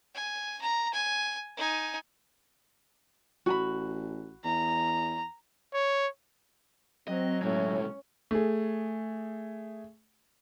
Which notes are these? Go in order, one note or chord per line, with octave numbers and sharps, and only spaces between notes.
G#5
A#5
G#5
D#4 G#5
A1 F#4 G#5 B5
E2 A#5
C#5
F#3 C4 D#5
B1 A2 G#3 C#4
A3 G#4